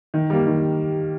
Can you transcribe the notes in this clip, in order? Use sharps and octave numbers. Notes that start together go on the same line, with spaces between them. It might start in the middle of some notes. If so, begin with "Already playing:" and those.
D#3
G3 A#3
D#3